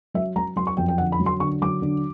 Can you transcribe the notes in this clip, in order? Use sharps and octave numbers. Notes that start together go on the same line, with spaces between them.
F#3 E5
F#3 A#5
F#3 C6
C#6
F2 G5
G5
D3 F#5
B5
F#3
C6
D3 C#6
F#3 D6
D3